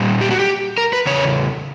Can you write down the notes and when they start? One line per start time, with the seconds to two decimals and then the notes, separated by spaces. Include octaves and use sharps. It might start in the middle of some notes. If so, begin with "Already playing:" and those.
Already playing: A#2 G3
0.21 G4
0.31 F#4
0.39 G4
0.78 A#4
0.93 B4
1.07 E2 C#3 C#5